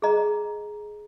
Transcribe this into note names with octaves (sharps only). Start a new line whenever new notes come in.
G#4 D#5 A#5